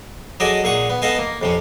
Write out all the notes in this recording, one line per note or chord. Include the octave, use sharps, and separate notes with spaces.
F#3 G#4 A4 D5 D#5 G#5
A#2 G#4 F#5 C#6
B3
B3 A4 D#5 F5 G#5
A#3
F2 C3 C#4